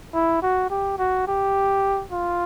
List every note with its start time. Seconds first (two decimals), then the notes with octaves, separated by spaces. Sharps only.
0.14 E4
0.42 F#4
0.70 G4
0.98 F#4
1.27 G4
2.11 F4